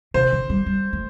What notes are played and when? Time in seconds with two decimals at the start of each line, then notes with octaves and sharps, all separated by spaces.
0.14 C3 C5
0.32 D3
0.50 G3
0.66 G3
0.93 A3